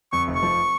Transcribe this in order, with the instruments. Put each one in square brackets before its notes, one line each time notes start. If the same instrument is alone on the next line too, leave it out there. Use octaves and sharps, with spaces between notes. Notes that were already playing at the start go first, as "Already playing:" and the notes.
[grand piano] F2 [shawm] C#6
[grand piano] F1
[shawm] C#6
[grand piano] F3